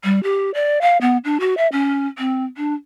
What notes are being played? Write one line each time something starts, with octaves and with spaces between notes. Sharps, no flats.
G3
G4
D5
F5
B3
D4
F#4
E5
C#4
C4
D4